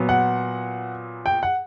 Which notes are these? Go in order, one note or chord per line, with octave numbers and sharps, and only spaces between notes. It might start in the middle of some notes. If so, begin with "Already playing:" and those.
Already playing: A#2 F#3 B3
F#5
G5
F#5